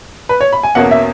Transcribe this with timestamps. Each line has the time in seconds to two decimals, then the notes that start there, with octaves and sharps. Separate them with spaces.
0.29 B4
0.41 C#5
0.53 B5
0.63 G#5
0.75 E2 B2 A#3 C#4 F#5
0.91 E5